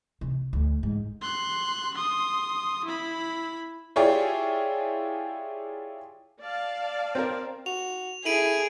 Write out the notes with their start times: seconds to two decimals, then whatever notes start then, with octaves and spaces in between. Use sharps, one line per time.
0.21 C3
0.53 D2
0.83 G#2
1.21 C6 F#6
1.95 C6 D#6
2.85 E4 B5
3.96 E4 F4 G4 G#4 C#5 D5
6.41 D5 F5 A5
7.15 C4 A#4
7.66 F#4 F7
8.25 E4 G#4 A4 D7 D#7 F#7